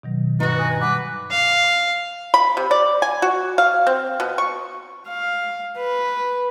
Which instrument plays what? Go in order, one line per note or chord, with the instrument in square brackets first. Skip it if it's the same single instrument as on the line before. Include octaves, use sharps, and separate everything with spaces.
[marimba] B2 D#3 F#3
[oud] G2 D#4 [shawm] F#4 [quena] B4
[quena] G#5 [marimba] D#6
[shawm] B4 [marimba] F#5 [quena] D6
[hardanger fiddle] F5
[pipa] B5
C3
D5
G#5
F#4
F5
C4
B2
C#6
[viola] F5
B4